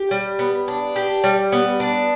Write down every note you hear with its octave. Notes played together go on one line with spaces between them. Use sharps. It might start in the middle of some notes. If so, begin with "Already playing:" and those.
Already playing: G4
G3
B3
D4
G4
G3
B3
D4